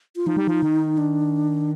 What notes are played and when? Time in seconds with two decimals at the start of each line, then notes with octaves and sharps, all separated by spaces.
0.16 F4
0.27 F3 D#4
0.37 G3
0.47 F3
0.63 D#3
0.97 D4